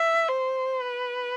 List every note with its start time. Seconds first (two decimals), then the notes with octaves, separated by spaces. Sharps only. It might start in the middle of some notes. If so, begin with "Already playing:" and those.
Already playing: E5
0.28 C5
0.82 B4